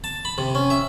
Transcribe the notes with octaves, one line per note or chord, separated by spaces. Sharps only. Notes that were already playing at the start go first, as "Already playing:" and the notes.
A5
B5
C3
C#4
E5